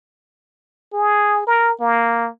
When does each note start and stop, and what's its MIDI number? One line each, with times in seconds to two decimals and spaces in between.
0.93 1.43 68
1.47 1.72 70
1.80 2.29 58